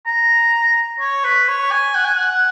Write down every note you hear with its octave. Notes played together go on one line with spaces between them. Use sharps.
A#5
C#5
B4
C#5
G#5
F#5
G#5
F#5